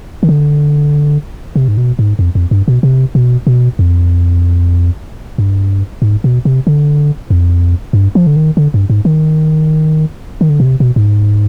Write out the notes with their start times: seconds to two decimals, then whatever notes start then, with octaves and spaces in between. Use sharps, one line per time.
0.23 D#3
0.29 D3
1.56 C3
1.68 G#2
1.77 B2
1.99 G#2
2.19 F2
2.35 F2
2.51 G2
2.68 B2
2.83 C3
3.15 B2
3.47 B2
3.79 F2
5.38 G2
6.02 G#2
6.24 B2
6.45 C3
6.67 D3
7.30 F2
7.93 G2
8.15 F3
8.27 D3
8.36 D#3
8.57 D3
8.74 G2
8.90 G#2
9.05 D#3
10.41 D#3
10.49 D3
10.60 B2
10.65 C3
10.80 B2
10.96 G#2